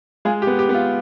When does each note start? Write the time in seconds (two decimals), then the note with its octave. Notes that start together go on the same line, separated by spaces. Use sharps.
0.25 G#3 F4 G#4
0.42 G4
0.47 B3
0.59 G4
0.69 B3
0.75 F4